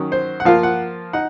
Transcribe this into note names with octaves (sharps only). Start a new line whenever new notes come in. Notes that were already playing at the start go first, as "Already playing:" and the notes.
Already playing: D#3 F#3 C#4
C5
F#5
F3 A#3 F4 F5
F#5
D#4 F#5